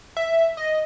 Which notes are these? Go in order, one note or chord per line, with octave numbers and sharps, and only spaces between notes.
E5
D#5